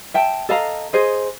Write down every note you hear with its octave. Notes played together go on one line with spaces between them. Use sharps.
E5 G5 A5
A4 D#5 F5 A#5
G#4 C5 D#5